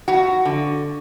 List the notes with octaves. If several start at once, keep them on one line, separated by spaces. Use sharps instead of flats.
F2 F#4
D3